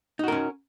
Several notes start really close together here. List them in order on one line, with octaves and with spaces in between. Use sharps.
D#4 F#4 A#4 C#4